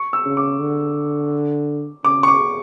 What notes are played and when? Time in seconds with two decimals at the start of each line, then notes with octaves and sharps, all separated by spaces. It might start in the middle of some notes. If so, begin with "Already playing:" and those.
Already playing: C#6
0.13 E6
0.25 C#3
0.37 D6
0.61 D3
2.04 C#3 D6
2.23 C#6
2.28 D6